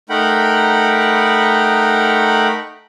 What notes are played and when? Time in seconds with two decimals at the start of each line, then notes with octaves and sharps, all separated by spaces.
0.10 A3 D#4 A#4 F#5 G5 B5